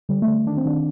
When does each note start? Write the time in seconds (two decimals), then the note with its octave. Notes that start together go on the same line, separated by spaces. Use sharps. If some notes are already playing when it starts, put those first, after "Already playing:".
0.09 D3 G3
0.22 A3
0.28 D3
0.46 D#3 D4
0.57 C4
0.65 D#3 D4